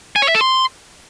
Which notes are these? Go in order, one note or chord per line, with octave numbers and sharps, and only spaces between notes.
G#5
C#5
E5
A4
C6